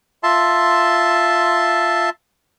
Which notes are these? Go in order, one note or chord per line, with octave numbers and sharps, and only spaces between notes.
F4 E5 A5 C6